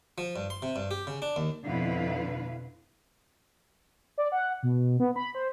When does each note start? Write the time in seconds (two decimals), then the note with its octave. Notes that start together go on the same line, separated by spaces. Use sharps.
0.18 F3
0.36 G2
0.50 C6
0.62 C3
0.76 G2
0.91 G4
1.07 C#3
1.22 D4
1.36 D#2
1.66 F2 B2 D3 E4 B4 F5
4.18 D5
4.32 F#5
4.63 B2
5.00 B3
5.16 B5
5.35 C5